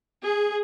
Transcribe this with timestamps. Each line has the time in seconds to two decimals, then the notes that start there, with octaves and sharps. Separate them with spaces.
0.21 G#4